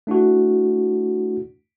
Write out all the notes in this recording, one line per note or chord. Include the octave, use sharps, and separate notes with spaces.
A3 D4 E4 F#4